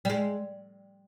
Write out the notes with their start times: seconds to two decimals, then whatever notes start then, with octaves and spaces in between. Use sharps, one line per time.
0.05 G3
0.10 G#3